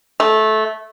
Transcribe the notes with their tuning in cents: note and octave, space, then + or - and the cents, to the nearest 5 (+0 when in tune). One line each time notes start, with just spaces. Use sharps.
A3 -15